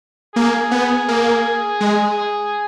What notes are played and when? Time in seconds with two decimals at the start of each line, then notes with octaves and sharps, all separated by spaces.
0.35 A#3 G#4
0.71 B3
1.08 A#3
1.81 G#3